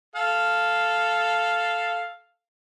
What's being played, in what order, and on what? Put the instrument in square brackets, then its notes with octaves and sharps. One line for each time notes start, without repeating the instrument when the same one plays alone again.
[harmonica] A4 F5